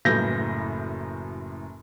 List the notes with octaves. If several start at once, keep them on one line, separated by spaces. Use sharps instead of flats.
F#1 F#2 A2 B4 G6 A#6